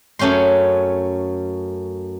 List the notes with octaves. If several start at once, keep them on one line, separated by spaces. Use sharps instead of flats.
F#2 A3 C#4 G5 C6